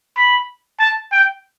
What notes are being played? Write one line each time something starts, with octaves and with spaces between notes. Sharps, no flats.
B5
A5
G5